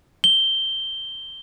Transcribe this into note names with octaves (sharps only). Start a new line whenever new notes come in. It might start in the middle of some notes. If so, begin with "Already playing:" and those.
G7